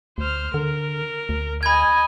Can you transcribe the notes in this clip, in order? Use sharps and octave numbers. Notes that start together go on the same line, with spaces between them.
D2 C5 F6
D3 A#4
D2
D#5 G#5 B5 G#6